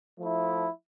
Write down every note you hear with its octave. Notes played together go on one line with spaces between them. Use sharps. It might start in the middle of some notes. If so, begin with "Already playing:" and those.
F3 A3 E4